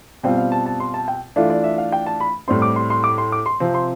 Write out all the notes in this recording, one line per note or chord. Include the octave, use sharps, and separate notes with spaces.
B2 G3 C4 F4 G5
F5
A5
A5
C6
A5
G5
E3 A3 D4 F4 E5
D5
E5
F5
G5
A5
B5
A2 G3 C4 C6
D6
C6
C6
D6
C6
D6
C6
C3 F3 C4
C6